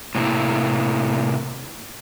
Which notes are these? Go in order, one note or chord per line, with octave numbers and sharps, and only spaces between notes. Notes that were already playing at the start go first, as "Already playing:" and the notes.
A2 C3 A#3 E4